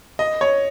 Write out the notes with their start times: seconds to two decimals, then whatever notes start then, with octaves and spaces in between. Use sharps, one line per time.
0.19 D#5
0.41 C#5